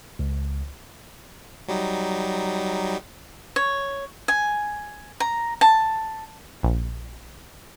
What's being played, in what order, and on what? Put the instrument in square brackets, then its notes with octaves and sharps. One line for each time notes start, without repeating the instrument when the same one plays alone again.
[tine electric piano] C#2
[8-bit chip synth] F#3 G3 D#4
[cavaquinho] C#5
G#5
A#5
A5
[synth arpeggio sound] A#1